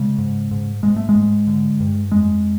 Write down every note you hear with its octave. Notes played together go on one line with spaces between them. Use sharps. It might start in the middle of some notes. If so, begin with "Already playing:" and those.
Already playing: C#3 G#3
G#2
G#2
G#2 G#3
A3
G#3
G#2
D3
G2
F2 G#3